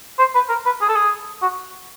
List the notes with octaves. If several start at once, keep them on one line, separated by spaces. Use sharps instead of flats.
C5
B4
A#4
B4
G#4
A4
G#4
F#4